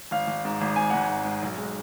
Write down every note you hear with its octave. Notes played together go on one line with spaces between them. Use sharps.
G#1 F5
G#1
G#2
G#1
G#2 G#5
G#1 F#5
G#5
G#2
G#2
B1
G#3